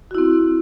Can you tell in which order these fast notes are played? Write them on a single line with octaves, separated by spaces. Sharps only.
F#4 E4 C4